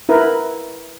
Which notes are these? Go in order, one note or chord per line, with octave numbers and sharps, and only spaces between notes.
E4 A#4 B4